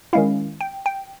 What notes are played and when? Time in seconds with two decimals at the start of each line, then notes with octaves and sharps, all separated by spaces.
0.13 D#3 G#3 C#4 E4 F5
0.61 G5
0.86 G5